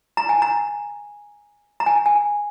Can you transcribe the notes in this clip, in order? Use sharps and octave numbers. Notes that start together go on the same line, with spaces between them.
A#5
G#5
A#5
A#5
G#5
G#5